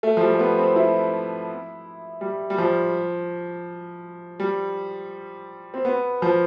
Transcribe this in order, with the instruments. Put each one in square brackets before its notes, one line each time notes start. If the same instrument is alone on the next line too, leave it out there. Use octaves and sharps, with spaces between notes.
[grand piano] A3
F3
G3
A3
B3
C4
E4
G3
G3
F3
G3
C4
B3
F3